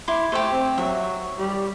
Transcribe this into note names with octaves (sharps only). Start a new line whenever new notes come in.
E4 C6 D6
A3 G4 C5
C4
F#3 E5
G3